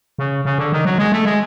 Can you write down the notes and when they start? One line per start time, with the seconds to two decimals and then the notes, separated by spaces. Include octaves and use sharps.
0.19 C#3
0.45 C#3
0.58 D3
0.72 D#3
0.85 F#3
0.98 G#3
1.12 A3
1.25 G#3